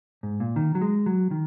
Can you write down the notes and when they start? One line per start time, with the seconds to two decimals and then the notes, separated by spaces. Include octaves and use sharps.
0.23 G#2
0.40 A#2
0.56 D#3
0.75 F#3
0.81 G#3
1.06 F#3
1.31 D#3